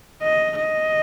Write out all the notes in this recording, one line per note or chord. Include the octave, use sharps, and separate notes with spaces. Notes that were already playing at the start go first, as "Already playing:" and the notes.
D#5
D#5